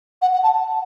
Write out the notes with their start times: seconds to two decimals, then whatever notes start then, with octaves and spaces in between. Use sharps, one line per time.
0.22 F#5
0.33 F#5
0.43 A5